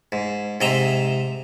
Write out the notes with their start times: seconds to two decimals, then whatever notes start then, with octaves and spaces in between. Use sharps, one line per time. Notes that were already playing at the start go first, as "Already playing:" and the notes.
0.12 G#2
0.61 G#2 C3 D#5 E5 A#5